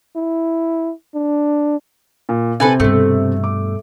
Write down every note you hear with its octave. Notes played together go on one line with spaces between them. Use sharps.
E4
D4
A#2
C3 C4 A4 B4 G#5
G2 B2 A3
D6